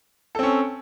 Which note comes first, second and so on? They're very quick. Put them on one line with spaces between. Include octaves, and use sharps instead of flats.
A4 C4 C#4